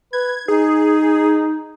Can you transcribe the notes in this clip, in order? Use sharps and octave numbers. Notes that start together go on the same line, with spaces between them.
B4 G#6
D#4 G#4